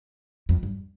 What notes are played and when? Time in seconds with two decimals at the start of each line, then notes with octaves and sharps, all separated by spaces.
0.49 F2
0.63 G2